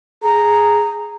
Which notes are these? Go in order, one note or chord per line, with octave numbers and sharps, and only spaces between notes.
G#4 A#5